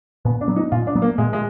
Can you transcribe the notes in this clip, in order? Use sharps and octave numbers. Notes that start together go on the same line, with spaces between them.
A#2 B3
D4
F#3 B3
D#4
A#2 F4
D4
F#3 B3
A#3
A#2 G#3
G#3